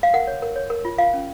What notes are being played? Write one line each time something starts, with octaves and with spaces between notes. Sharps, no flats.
F5
A#4 F#5
C#5
A#4
C#5
A#4
F4
F4 F5
C#4